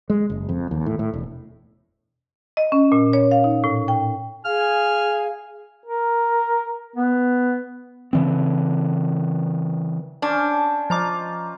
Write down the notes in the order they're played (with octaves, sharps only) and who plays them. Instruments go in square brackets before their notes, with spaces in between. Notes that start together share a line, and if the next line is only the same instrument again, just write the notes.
[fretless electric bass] G#3
F#1
F2
D#2
A2
A2
E1
[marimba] D#5
C#4
A#2
C#5
F5
D#4
A2
G5
[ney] G#4 [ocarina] F5 [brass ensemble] G#5 [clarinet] F6
[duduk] A#4
B3
[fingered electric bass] C#3 E3 C4
[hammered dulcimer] C#4 C5 [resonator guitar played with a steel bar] D4
[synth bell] F3 A#5 D6 [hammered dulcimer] F4 D#5